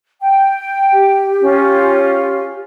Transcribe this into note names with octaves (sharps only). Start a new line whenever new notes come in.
G5
G4
C#4 F4